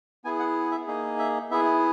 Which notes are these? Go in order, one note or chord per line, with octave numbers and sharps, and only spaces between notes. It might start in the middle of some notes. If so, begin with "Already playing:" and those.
B3 E4 G#4 G#5
F#5
E5
A#3 D#4 G#4
E5
B3 E4 G#4 E5